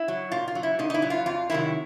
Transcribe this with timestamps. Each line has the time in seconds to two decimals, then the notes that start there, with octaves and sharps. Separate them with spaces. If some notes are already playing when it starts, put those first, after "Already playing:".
Already playing: E4
0.08 F#3
0.32 A#2 F4
0.48 F4
0.55 F#3
0.63 E4
0.79 A#2 D#4
0.90 D#4
0.94 E4
1.02 F#3
1.10 F4
1.26 F2 F4
1.50 C3 D#3 F#3 E4